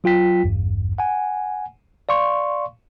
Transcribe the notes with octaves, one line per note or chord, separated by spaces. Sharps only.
F#3 F4 G5 B6
A1 E2 G2
F#5 G#5
D5 F5 C6 C#6